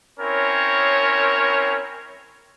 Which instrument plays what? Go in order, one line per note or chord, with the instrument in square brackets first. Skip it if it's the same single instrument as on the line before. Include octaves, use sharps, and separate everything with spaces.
[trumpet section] C4 C#4 E4 A#4 C#5